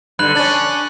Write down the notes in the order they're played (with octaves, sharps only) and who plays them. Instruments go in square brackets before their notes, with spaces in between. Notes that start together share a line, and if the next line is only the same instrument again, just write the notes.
[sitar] G2 D3 [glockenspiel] B5 F#6 F#7
[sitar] C#4 D4 [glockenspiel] A6 F#7